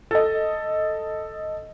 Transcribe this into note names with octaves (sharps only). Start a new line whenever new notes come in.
A4 D#5